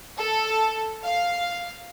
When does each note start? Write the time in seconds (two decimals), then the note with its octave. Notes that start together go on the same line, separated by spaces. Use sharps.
0.18 A4
1.03 F5